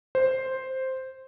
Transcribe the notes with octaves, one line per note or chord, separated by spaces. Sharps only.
C5